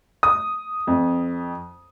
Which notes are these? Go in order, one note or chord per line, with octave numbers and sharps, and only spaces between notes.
D#6
F2